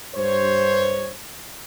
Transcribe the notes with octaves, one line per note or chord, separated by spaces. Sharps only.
G2 C5 C#5